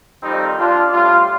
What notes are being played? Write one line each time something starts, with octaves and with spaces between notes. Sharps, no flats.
F2 D#3 G3 C4 D#4
D4 F4
A2 G3 D4 F4